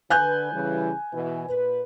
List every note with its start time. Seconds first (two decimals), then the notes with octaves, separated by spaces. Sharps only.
0.10 D3 B4 G#5 F#6 G6
0.52 C#3 E3 G3
1.12 B2 E3
1.48 A#2 B4